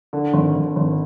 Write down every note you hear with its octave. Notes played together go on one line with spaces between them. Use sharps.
D3
G#1
G#1
G#1